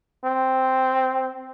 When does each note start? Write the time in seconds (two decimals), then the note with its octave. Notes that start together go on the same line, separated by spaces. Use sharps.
0.25 C4